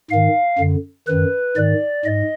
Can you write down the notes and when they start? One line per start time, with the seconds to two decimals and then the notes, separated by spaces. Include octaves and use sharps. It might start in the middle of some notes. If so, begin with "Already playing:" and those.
0.10 G#2 D#3 F5
0.59 F#2 D3
1.07 F#2 D#3 B4
1.56 G#2 D#3 D5
2.05 G#2 D#5